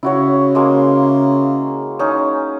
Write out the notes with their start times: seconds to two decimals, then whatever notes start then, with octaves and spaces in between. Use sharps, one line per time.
0.03 C#3 E4 F#4 C#5
0.55 G#3 A#3
1.99 C#4 D#4